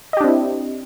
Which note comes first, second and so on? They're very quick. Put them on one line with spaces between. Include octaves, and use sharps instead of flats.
D#5 G4 D4 C4 E4